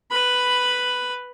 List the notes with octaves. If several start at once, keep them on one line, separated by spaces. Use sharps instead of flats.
B4 B5